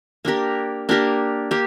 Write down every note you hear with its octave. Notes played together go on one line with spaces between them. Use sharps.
A#3 D4 G4 A#4
A#3 D4 G4 A#4
A#3 G4